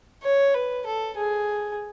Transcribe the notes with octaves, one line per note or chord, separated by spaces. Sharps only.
C#5
B4
A4
G#4